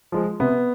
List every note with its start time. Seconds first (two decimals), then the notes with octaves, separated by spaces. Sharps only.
0.12 F3 G#3
0.40 C3 B3